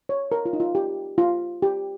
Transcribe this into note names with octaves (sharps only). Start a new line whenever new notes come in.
C#5
A#4
F4
D#4
F4
G4
F4
G4